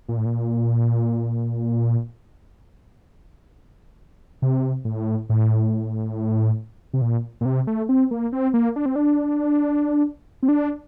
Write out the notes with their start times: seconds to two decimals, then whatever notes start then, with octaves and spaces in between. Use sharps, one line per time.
0.09 A#2
0.17 A2
0.25 A#2
4.42 C3
4.85 A2
5.29 A2
6.94 C3
7.02 A#2
7.41 A#2
7.45 C3
7.67 A3
7.89 C4
8.11 A#3
8.32 C4
8.54 A#3
8.76 D4
8.86 C4
8.96 D4
10.43 C4
10.48 D4